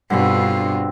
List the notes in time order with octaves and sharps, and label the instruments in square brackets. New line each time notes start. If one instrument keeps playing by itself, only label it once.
[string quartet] G2 B2 F4 [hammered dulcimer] D3 C4